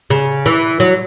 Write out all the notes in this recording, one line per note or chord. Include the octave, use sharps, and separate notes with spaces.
C#3
E3
F#3